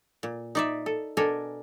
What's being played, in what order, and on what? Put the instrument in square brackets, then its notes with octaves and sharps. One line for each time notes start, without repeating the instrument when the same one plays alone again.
[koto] A#2
D#4 D5 E5
A4
B2 D4 A4 A#4 G#5